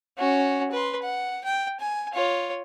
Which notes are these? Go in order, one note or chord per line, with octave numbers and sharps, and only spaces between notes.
C#4 F#4
B4 C6
F#5
G5
G#5
F4 C#5